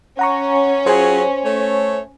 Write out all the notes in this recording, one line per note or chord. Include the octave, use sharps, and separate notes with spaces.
C#4 F#5 A#5 C#6
F#3 F4 G#4 C5 G#5
A3 C#5